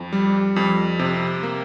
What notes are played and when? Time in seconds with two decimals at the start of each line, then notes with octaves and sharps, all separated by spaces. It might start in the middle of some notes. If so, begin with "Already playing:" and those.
Already playing: F2
0.13 G3
0.56 F2
0.99 C3
1.43 A#3